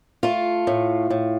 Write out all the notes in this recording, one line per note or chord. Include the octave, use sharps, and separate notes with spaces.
A3 F4
A2
A2